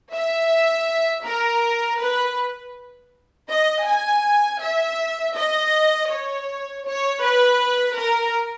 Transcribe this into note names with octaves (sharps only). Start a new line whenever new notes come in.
E5
A#4
B4
D#5
G#5
E5
D#5
C#5
C#5
B4
A#4